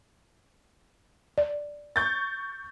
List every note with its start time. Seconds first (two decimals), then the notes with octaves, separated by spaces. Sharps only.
1.38 D5
1.96 C#6 G6 A6